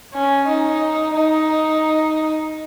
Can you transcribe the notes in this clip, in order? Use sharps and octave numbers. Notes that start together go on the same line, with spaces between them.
C#4
D#4
D#4